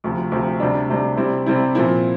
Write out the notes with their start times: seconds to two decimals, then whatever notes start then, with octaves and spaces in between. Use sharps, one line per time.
0.04 D2 C3 F3
0.32 D2 C3 F3
0.60 D2 C3 G3 D4
0.89 D2 C3 G3 D4
1.17 C3 G3 C4 E4
1.46 C3 G3 C4 E4
1.75 A#2 F3 C4 E4